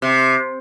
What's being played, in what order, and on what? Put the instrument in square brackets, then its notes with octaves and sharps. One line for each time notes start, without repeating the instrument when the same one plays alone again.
[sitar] C3